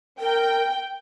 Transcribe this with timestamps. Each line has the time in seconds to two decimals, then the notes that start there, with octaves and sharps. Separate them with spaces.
0.20 A#4 G5